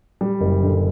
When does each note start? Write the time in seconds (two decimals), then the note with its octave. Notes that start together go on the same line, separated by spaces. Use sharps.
0.21 G3
0.41 F#1
0.62 D3